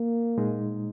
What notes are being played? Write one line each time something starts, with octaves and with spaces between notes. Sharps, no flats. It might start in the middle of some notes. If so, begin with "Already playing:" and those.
Already playing: A#3
A#2 G#3 D#4